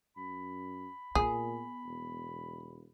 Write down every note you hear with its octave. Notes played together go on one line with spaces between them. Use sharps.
F#2 B5
A#2 B3 G#4
E1